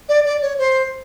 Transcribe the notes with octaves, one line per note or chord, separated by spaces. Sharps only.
D5
D5
C#5
C5